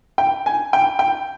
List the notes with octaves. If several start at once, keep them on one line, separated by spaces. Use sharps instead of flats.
G5
G#5
G5
G5